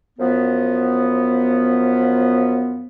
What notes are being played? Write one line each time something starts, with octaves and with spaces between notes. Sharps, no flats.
F#2 F3 B3